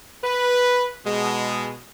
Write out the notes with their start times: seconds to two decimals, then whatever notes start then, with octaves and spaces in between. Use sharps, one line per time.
0.24 B4
1.06 B2 G#3